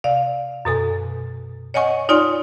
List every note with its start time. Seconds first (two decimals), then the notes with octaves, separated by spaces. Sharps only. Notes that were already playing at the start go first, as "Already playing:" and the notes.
0.04 C3 D5 F5
0.65 F#2 B2 A4 G#5
1.74 C#5 D#5 F#5 G#5 C#6
2.09 D#4 F4 C#5 D5 G#5 C6